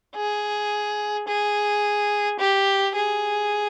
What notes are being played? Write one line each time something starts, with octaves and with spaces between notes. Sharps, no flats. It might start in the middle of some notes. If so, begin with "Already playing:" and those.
G#4
G#4
G4
G#4